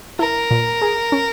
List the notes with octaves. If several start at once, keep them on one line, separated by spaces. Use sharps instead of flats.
E4 A#4
A#2
G#4
C#4